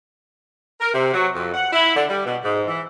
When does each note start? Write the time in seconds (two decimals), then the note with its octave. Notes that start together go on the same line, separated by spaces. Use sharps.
0.81 A#4
0.94 C3
1.14 F#3
1.35 F2
1.54 F#5
1.73 E4
1.96 D3
2.09 G3
2.26 B2
2.44 G#2
2.67 E3